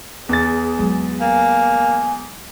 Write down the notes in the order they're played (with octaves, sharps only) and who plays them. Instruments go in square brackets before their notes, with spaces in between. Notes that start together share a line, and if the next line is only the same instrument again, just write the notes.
[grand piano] E2 A6 [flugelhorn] G#4
[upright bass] F#3 G#3
[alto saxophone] A#3 [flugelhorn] G#5